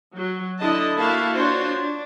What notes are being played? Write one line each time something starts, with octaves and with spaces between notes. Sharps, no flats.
F#3
D3 E4 D#5 A5
A#3 E4 F#4 E5 F5 A5
D4 F4 F#4 C5 C#5
D4